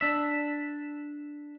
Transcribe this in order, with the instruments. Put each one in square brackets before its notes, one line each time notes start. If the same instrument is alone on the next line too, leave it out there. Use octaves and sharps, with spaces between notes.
[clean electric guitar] D4 E5